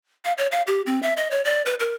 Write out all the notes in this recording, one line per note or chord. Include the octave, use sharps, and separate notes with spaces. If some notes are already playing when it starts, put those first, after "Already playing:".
F5
C#5
F5
G4
C4
E5
D#5
C#5
D5
B4
A#4